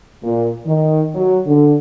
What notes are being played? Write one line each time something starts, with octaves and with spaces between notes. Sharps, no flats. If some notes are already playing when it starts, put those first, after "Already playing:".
A#2
D#3
F#3
D3